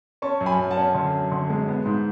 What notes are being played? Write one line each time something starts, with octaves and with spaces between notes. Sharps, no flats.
C#4 A5 C#6
F#2
G#5 B5
F#2
F#5 A5
C#4
D3
F#2
D3
G#3
B3
G#2